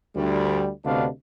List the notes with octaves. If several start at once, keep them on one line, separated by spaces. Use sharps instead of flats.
D2 G3
D2 C3 B3 D4 D#5 F5